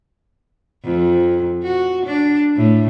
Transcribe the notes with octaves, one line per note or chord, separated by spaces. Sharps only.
F2
F#4
D4
A2